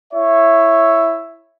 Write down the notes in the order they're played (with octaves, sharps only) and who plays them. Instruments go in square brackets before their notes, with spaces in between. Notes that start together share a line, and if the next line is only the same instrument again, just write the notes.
[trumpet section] E4 C#5 E5